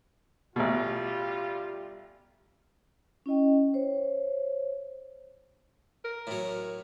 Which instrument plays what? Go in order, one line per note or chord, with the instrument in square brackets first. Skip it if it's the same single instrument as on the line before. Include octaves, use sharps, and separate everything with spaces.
[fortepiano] A1 B2 [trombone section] G3 F4
[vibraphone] C#4 E4 D#5 G5
C5 C#5
[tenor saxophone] A#4
[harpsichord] A2 F#3